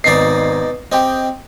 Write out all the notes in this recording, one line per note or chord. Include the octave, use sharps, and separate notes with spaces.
G#1 B2 D#4 D5 C7
C4 G4 D#5 G5